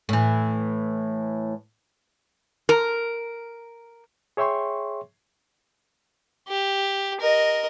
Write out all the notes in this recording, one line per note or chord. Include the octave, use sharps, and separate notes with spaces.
A2 E3
A#4
G#4 C#5 E5 G5 C6 C#6
G4
A#4 D#5